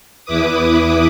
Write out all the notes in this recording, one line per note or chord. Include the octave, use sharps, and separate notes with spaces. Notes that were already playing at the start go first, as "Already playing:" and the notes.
E2 E4 B4 D6 D#6